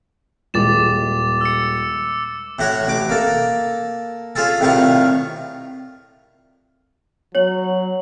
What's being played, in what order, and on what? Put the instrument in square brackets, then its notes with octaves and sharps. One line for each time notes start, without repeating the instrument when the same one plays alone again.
[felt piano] D#1 G#3 [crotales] D6 A6 E7
[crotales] E6 C#7
[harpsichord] A2 F#4 C#5
A1 D6
A#3 A4
C#4 F4 G#4 A4
C2 A2 D#3 F4 F5 C#6
[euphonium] F#3 [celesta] C#5 F#7